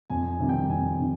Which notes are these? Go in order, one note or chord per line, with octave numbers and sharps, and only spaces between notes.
F2 G#5
G#5
C3 D#3 G3
G5
F2 G#5
C3 D#3